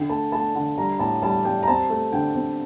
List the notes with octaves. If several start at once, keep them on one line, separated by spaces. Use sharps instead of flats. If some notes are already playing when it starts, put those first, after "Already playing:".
Already playing: D3 G5
A3 A5
A3 A5
D3
G3 A#5
A2 A5
G3 A5
G3 G5
A#5
C4 A5
A3
D3 G5
C4